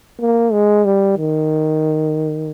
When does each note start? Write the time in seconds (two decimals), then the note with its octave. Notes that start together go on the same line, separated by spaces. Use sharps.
0.20 A#3
0.53 G#3
0.85 G3
1.18 D#3